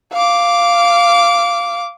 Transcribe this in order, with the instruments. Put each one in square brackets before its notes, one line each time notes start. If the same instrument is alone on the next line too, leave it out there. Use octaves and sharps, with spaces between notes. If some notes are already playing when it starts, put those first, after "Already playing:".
[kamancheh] F5 D6